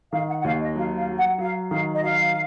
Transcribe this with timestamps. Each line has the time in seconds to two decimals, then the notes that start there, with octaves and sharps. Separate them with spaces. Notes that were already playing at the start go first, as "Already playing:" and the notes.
0.13 D#3 F5
0.28 F#5
0.40 F#5
0.44 D#2 F5
0.61 D#5
0.75 F#3 F5
0.96 F5
1.08 F#3
1.17 F#5
1.38 F#3 F5
1.70 D#3 F5
1.94 D#5
2.01 F#3 F5